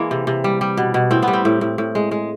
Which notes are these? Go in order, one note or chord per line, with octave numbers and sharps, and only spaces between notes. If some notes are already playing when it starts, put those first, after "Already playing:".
Already playing: E3 G#3 A#3
C3
C3
G3
G3
B2
B2
A2 C4
B3
G3
C4
A2
A2
A2
G#3
G#3